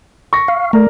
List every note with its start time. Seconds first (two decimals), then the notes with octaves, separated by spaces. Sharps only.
0.33 C#6 A#6
0.48 F5
0.73 A3 A#4 D5